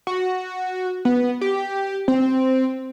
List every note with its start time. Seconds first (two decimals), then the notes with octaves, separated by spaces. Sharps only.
0.07 F#4
1.05 B3
1.41 G4
2.08 C4